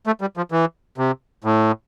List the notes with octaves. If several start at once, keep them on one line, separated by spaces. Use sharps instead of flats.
A3
G3
F3
E3
C3
A2